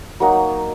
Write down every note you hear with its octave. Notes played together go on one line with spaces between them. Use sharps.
F#3 A#3 D#4 F#4